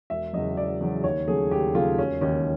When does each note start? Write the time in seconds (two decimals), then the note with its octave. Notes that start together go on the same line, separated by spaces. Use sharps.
0.10 E1 E5
0.33 E2 C#3 F#3 D#5
0.57 E1 D5
0.81 E2 C#3 F#3
1.04 D#2 C#5
1.27 C#3 F#3 A3 G#4
1.51 D#2 G4
1.75 C#3 F#3 A3 F4
1.98 E1 C#4
2.21 D#2 D#3 C#4